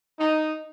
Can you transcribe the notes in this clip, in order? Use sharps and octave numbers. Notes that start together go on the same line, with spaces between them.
D#4